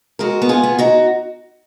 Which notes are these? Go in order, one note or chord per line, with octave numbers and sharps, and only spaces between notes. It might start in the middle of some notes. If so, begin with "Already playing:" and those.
G#3 F#4 A#4
B3
F4 G#4
B3
D#4 F#4